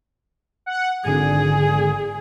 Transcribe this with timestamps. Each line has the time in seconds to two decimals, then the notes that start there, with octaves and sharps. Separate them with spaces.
0.66 F#5
1.05 G#1 D3 G#4